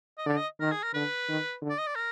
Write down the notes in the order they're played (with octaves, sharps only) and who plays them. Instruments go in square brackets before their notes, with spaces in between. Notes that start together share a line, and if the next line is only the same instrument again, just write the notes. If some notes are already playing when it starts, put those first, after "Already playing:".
[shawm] D#5
[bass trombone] D3 [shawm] D5
[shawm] D#5
[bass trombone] D#3 [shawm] A#4
[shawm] G#4
A#4
[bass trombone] D3 [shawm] B4
[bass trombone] D#3
D3
[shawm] D5
D#5
D5
A#4